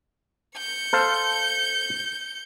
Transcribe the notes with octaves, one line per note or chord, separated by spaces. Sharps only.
G6 C#7
A4 C5 F5